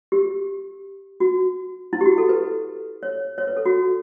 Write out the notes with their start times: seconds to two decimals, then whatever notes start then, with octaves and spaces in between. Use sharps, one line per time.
0.12 G4
1.20 F#4
1.93 E4
2.01 G4
2.05 F#4
2.18 A4
2.29 B4
3.03 C#5
3.38 C#5
3.47 B4
3.57 A4
3.66 F#4